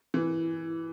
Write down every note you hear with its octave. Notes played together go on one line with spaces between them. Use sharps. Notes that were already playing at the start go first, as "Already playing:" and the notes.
E3